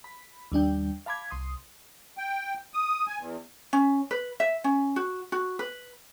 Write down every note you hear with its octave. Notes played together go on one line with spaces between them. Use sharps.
B5
D#2 G3 D4 G5
F5 A5 B5 D6 G#6
C2 C6 D#6
G5
D#6
G#5
E2
C#4
B4
E5
C#4
F#4
F#4
B4